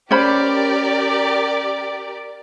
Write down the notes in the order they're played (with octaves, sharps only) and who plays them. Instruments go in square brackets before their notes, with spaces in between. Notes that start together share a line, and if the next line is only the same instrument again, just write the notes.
[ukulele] C#4 C5 B5 [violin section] G4 A#4 D5